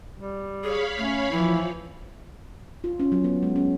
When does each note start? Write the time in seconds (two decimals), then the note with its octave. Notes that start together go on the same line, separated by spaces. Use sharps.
0.18 G3
0.63 G#4 C#5 F5 B5
0.98 A3 C#4
1.31 E3 F3 E4
2.84 F4
3.00 C#4
3.12 F#3
3.24 B3
3.43 G#3
3.56 C#4